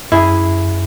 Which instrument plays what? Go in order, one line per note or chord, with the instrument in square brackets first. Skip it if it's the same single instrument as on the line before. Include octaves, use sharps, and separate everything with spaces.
[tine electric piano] F#2 [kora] E4 G#4